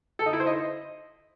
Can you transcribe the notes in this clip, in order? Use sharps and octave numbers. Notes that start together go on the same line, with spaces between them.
A4
D#4
E4
C5
D#5